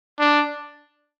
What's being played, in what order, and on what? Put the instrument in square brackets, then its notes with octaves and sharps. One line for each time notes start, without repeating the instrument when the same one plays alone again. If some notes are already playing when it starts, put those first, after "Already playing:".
[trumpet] D4